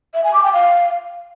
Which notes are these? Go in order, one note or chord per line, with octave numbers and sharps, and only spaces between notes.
E5
G#5
D6
G5
F5